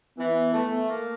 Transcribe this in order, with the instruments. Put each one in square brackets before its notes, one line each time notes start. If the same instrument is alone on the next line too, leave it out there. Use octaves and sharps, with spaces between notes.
[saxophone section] E3 [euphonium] B3
[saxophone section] A3
A#3